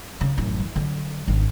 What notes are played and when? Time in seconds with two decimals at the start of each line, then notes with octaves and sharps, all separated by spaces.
0.21 C#3
0.38 A1 F#2
0.60 E3
0.76 D3 F#3
1.28 G#1 D4